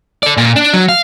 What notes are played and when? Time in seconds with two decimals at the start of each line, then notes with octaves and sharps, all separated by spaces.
0.23 A4 D5
0.37 A#2
0.56 D4
0.74 F#3
0.89 F5